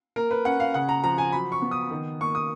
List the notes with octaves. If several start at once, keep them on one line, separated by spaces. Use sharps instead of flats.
A#3 A#4
B4
C#4 F#5
F5
C#3 F#5
A#5
F3 A#5
G#5
F#3 B5
C#6
B3
D#6
D#3
A#3 C#6
D#6